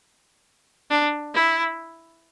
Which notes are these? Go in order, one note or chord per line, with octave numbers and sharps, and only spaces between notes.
D4
E4